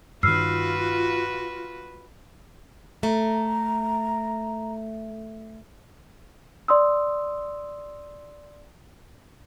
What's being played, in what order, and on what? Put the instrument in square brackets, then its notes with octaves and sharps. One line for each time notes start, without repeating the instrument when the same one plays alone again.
[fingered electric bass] G2 D#3 [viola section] F4 [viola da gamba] F#4 B4 [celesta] E6 F6 C7
[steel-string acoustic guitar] A3 [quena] A#5
[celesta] D5 C6 D#6 E6